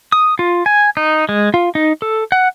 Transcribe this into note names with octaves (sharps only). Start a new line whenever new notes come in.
D#6
F4
G#5
D#4
G#3
F4
D#4
A4
F#5